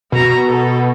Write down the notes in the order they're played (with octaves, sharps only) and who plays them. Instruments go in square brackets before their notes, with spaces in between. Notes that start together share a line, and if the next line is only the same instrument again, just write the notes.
[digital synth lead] B2 [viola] F#4 A#5
[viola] A4